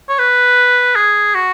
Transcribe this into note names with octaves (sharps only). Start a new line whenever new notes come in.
C#5
B4
G#4
F#4